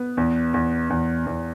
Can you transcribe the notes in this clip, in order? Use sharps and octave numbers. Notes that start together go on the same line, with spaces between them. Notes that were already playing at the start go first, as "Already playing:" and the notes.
Already playing: B3
E2
E2
E2
E2